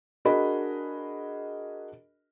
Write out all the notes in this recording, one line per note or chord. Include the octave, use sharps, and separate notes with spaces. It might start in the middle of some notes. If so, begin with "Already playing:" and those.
D4 F#4 G#4 A#4 D#5 B5